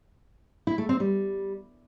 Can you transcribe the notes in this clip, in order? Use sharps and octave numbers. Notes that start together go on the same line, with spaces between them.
E4
A3
C4
G3